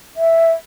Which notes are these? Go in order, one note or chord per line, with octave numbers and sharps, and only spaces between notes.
E5